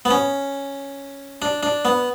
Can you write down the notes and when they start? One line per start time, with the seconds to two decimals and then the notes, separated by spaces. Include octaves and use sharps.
0.05 B3
0.11 C#4
1.42 D4
1.63 D4
1.85 B3